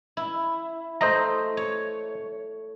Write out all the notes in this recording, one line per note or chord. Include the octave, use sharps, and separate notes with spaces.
E4
A3 C5 D#5 A#5
C#5